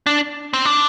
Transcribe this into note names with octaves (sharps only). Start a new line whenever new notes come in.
D4
C4
D4